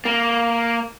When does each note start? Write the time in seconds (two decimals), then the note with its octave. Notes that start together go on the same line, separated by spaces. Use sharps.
0.05 A#3